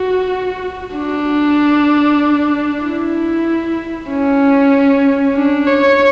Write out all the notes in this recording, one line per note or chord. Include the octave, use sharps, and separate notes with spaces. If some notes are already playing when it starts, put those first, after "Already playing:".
Already playing: F#4
D4
E4
C#4
D4
C#5